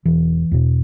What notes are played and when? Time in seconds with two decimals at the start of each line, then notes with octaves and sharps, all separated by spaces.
0.05 E1 E3
0.52 E2 B2